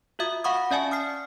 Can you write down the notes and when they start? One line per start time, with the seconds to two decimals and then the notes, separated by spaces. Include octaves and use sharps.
0.19 F4 F#4 E5 D#6
0.44 F5 F#5 B5 C#6 D#6
0.71 C#4 D5 E5 G#5 A5
0.91 D#6 F6 C7